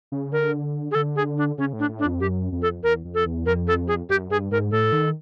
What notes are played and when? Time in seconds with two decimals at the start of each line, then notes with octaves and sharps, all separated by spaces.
0.12 C#3
0.32 D3 A#4
0.91 G#4
0.95 D3 A4
1.16 G#4
1.38 D4
1.58 C#3 C#4
1.73 A2
1.79 D4
1.89 A2
1.99 D4
2.05 F2
2.20 F#2 G4
2.52 F2
2.62 A4
2.83 E2 A#4
3.05 F2
3.15 A4
3.25 E2
3.46 F2 A#4
3.67 A4
3.88 G#4
4.09 F#2 G4
4.30 G2 G#4
4.51 G#2 A#4
4.71 A2 A4
4.92 D#3